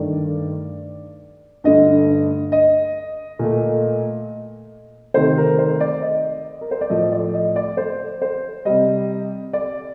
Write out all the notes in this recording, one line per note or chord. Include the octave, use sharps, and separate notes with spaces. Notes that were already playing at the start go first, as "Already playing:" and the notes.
Already playing: G2 D#3 A3 D5
G2 D3 A3 D#5
D#5
A#2 A3
C3 D#3 A3 C5
A#4
C5
D5
D#5
A#4
C5
D5
A2 F3 A3 D#5
D5
D#5
D5
C5
C5
C3 G3 D#5
D5